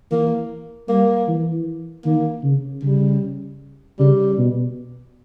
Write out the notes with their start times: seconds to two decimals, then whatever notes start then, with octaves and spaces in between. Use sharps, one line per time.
0.11 E3 A#3
0.88 G3 A#3
1.28 E3
2.05 D#3 A#3
2.43 C#3
2.83 C#3 G3
3.99 C#3 G3
4.38 B2